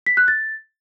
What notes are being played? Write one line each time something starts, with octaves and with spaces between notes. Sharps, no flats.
B6
F#6
A6